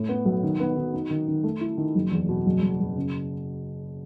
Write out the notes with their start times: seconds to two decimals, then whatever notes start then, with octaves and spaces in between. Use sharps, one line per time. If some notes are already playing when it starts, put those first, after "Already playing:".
Already playing: A2
0.09 B3
0.25 B1
0.43 D#3
0.60 B3
0.77 D#3
0.93 D#4
1.10 D#3
1.28 D#3
1.44 A3
1.61 E4
1.78 D#3
1.95 F#1
2.11 E2
2.29 B2
2.46 F#1
2.62 F#1
2.80 F#1
2.96 C#3